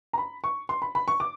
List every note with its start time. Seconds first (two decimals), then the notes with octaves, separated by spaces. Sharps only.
0.13 A#5
0.18 B5
0.44 C#6
0.69 C6
0.82 B5
0.95 B5
1.08 C#6
1.20 D6